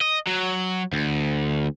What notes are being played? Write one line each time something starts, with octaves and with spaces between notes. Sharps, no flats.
D#5
F#3
D2